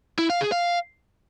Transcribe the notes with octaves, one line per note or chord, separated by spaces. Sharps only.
E4
F5
G#4
F5